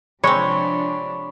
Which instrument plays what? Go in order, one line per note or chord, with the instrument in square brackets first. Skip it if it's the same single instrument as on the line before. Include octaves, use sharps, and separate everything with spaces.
[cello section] C3 F3 D4 [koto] G#3 C4 [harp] C#5 [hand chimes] B5 C#6